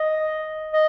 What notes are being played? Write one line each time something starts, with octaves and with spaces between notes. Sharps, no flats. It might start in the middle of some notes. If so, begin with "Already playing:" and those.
Already playing: D#5
D#5